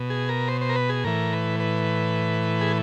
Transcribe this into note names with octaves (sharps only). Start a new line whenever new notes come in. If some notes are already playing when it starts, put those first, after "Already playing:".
Already playing: B2
G#4
A#4
C5
C5
A#4
B4
G#4
A2 E3 A#4
B4
B4
G#4